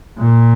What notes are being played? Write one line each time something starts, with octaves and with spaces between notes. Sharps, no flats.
A#2